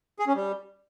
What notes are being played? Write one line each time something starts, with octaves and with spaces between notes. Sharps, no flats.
G#4
C#4
G3